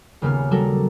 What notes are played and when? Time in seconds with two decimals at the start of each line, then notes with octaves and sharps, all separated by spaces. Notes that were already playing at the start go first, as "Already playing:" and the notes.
0.22 D#1 C#3 A#3 B3 F6
0.51 F#3 G3 F#4 A4 A#4